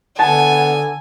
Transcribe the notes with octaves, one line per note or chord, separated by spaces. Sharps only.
D3 B3 G#5 A5